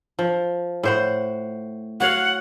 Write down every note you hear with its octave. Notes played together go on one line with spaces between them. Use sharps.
F3
A2 C5 F#5
F#4 C#5 F5 F#5